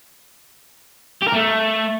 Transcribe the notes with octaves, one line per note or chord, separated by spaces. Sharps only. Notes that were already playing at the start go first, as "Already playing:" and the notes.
G4
A#4
A3